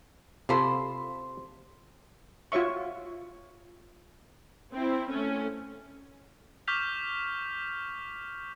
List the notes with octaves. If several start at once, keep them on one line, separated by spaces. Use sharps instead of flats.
C3 F4 A4 C5 B5 C6
F4 F#4 C#5 E5 C#6
C4 E4
A3 C#4
C#6 D6 F6 G6 B6 F7